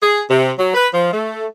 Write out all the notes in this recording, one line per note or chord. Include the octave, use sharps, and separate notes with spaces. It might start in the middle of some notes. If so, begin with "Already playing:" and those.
G#4
C3
F#3
B4
F3
A3